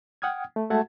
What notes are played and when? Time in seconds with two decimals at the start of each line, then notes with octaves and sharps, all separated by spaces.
0.22 F#5 G5 D#6 F6 G#6
0.56 A3
0.70 G#3 A3 F#4 F#5 A5 G#6